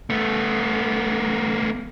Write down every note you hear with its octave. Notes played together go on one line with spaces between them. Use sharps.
A3 B3